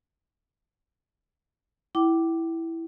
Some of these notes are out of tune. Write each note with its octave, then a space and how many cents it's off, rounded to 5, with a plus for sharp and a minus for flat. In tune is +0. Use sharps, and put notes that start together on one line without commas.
E4 +0 G5 -35 D6 +0